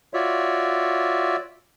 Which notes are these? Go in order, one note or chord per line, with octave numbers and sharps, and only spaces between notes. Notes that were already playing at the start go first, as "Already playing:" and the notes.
F4 F#4 C#5 D5 E5